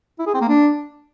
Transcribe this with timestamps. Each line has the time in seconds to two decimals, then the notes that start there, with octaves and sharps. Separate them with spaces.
0.19 E4
0.27 G#4
0.34 C4
0.41 A#3
0.49 D4